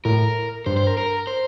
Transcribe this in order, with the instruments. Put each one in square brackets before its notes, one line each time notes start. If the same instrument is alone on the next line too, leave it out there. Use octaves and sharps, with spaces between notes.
[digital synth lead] A2 [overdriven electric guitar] A#4
[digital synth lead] G2 [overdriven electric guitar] C5
[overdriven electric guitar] C5
A#4
A#4
C5